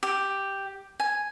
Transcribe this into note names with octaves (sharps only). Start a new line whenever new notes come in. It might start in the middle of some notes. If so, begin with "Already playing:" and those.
G4
G#5